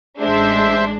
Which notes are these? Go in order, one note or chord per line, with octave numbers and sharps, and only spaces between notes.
A1 G#3 D4 C5 E5